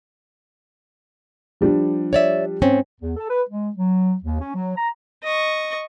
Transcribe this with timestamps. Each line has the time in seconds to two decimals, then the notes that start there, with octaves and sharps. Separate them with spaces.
1.61 F3 G3 D4
2.13 C#5 D5 E5
2.62 G#2 C4 C#4
3.01 E2
3.17 A4
3.29 B4
3.49 G#3
3.76 F#3
4.23 D#2
4.41 C#4
4.55 F#3
4.76 A#5
5.23 D#5 C#6